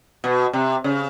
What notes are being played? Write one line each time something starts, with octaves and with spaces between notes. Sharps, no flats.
B2
C3
C#3